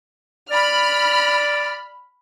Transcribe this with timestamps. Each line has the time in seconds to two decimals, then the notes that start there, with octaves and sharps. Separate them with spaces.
0.51 D5 B5 F6